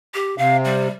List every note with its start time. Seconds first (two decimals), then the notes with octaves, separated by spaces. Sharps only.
0.14 G4
0.38 C3 F5
0.65 G3